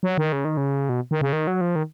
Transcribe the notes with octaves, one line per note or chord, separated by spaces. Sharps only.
F#3
D#3
C#3
D#3
C#3
B2
D#3
C#3
D#3
F#3
F3
D#3